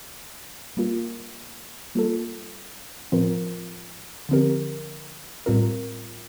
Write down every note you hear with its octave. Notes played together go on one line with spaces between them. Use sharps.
G3 A#3 F4 A#4
G3 A#3 F4 A4
A2 F3 C4 F4 A#4
D3 F3 C4 G4 A#4
A2 G3 C4 F4 A#4